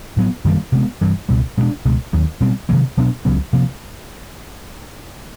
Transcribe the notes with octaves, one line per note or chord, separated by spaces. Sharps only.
A2 F#3 B3
F#2 D#3 G3 A#3
C3 F3 G#3 B3
G2 E3 G3
C#2 B2 G3
B2 G#3 B3 D4
C#2 B2 G#3
D#2 D#3 F#3
B2 G3 C4
C3 D#3 F#3 A#3
B2 F#3 B3 D4
C#2 C#3 F#3 B3
C3 F3 A#3